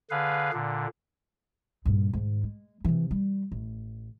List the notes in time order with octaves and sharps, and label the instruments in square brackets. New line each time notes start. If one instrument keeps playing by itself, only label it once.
[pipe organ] D3 G#4 B4 F5
A#2 D3
[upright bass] G2 A#2
G#2 D#3
G#3
C3 E3
G3
A1